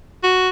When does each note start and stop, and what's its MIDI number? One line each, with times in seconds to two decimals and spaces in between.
0.23 0.50 66